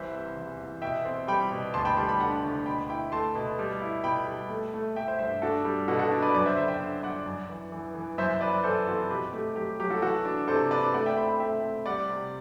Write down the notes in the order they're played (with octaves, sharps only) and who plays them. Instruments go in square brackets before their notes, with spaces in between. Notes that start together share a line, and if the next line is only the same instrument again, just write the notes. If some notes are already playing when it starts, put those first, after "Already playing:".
Already playing: [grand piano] C2 E3 C5 E5
C3
E2
E2
B2 E5 G5
C4
G3 G5 B5
B2
D2 A5 C6
G5 B5
G3 A5 C6
G5 B5
D3 F#5 A5
D2
B2 G5 B5
E4 G5 B5
A3 A5 C6
B2
G3
E4
B2 G5 B5
G3
A3
A3
A3 E5 G5
C5 E5
G2 C5 E5
D4 F#4 A4
G3
B2 F#4 A4
F#4 A4
D4
B4 D5
F#2 B4 D5
C5 E5
D3 C5 E5
E5 G5
D3
F#2 D5 F#5
F#2
E3
E3
E3
F#2 C5 E5
F#2 B4 D5
E3 A4 C5
C4 F#4 A4
B2 G4 B4
A3 G4
F#3 G4
F#3 G4
F#4 A4
E3 F#4 A4
D4
C3 A4 C5
D4 B4 D5
A3 D5 F#5
E5 G5
C4 G5 B5
G5 B5
A3 E5 G5
C4
G3 D5 F#5
C3